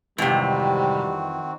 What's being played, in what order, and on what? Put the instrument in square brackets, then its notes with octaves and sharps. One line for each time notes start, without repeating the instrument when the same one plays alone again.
[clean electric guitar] F2 E3 [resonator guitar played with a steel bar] G#2 C3 [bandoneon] D#3 C4 F#4 [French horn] G3